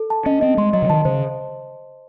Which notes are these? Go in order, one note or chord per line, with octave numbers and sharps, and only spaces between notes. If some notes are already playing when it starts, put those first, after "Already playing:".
Already playing: A4
A5
C#4 D#5
C4 D#5
G#3 C6
F#3 D#5
C#3
D#3 A5
C#3 C5